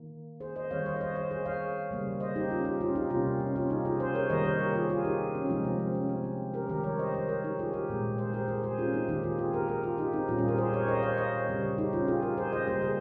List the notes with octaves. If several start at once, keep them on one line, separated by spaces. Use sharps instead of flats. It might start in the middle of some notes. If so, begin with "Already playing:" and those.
Already playing: D#3 A#3
G#4 C5
C5 D#5
D#3 G3 C4 C#5 F5
C5 D#5
C#5
C5 D#5
C5 D#5
G#4 C5
C#5 F5
C#3 G3 A#3
C5 D#5
D#4 G4
C#4 F4
D#4 G4
C#4 F4
D#4 G4
C3 G3 A#3 C#4 F4
C#4
C#4 F4
D#4 G4
F4 G#4
G#4 C5
A#4 C#5
D#3 G3 A#3 C5 D#5
A#4 C#5
G4 A#4
F4 G#4
F4 G#4
D#4 G4
C#4
F4
C3 F3 G#3 C4 D#4
C4
C4
C#4
C4
C4
G4 A#4
D#3 G3 C4 G4 A#4
A#4 C#5
C5 D#5
C5 D#5
A#4 C#5
D#4 G4
F4 G#4
G4 A#4
A#2 G#3 C4
G#4 C5
G4 A#4
G#4 C5
G#4 C5
C#4 F4
C4 D#4
D#3 A#3 D#4 G4
F4 G#4
F4 G#4
G4 A#4
G4 A#4
F4 G#4
D#4 G4
C4 D#4
A#2 G3 C4 C#4 F4
F4 G#4
G4 A#4
G#4 C5
A#4 C#5
C5 D#5
C#5 F5
C5 D#5
C#3 G3 C4
D#4 G4
C#4 F4
F4 G#4
G4 A#4
G#4 C5
C5 D#5
C#3 G3 A#3 G#4 C5
G#4 C5